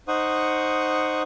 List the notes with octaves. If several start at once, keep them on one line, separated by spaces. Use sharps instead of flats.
D#4 C5 F#5 C#6 D#6